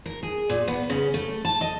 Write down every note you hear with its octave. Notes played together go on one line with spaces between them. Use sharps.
A#4
G#4
A#2
B3
C#3
A3
A5
D#5